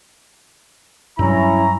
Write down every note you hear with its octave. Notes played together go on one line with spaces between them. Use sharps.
G2 F#3 C#4 E4 A#5